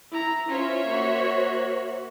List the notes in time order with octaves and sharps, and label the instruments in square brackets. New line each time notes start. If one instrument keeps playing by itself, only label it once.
[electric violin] E4 A#5
[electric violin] C#4 F4 [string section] C5 C#5 E5
[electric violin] A#3 F#4